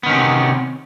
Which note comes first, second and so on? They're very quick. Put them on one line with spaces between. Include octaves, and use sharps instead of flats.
B3 D#3 C#4 C3